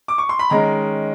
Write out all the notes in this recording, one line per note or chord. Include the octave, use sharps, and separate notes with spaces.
D6
C#6
C6
B5
D#3 G#3 C#4 A#5